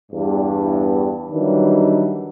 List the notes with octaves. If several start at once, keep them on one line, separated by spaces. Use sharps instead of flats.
E2 G2
D#3 E3 F#3 G3 D4 D#4